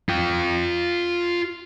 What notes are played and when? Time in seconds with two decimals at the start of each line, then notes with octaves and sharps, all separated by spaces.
0.09 F4 G5